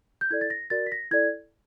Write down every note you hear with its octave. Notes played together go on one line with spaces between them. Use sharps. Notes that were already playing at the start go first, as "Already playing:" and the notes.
G6
E4 A4 D5 G#6
A6
A#6
F#4 A#4 D5 A6
B6
A#6
E4 A4 D5 G#6